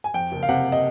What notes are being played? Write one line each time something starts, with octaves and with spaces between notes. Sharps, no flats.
G#5
F2 G5
F#1
F5
C3 F#5
D#5